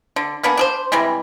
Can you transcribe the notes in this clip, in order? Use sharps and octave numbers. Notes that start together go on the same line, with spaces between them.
D3
A#3 B3 D4 G#4
D4 G#4 C5
C3 E3 G3 G#3